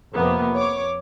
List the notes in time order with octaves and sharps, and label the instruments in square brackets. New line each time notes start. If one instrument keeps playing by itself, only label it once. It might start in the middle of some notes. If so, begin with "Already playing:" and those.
[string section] F2 C3 A#3 B3
C#5 D6